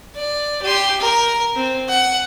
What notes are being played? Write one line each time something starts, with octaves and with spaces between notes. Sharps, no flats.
D5
G4 C6
A#4
C4
F#5